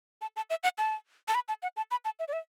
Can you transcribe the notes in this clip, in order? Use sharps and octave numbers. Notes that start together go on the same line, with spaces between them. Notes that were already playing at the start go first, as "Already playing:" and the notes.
A5
A5
E5
F#5
A5
A5
B5
A5
F#5
A5
B5
A5
E5
D5
E5